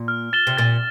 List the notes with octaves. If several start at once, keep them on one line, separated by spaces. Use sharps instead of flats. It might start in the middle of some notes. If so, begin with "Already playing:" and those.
Already playing: A#2
F6
A6 E7 G7
C3
A#2 A6